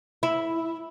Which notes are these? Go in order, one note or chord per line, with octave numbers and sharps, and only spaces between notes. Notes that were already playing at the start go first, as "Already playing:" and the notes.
E4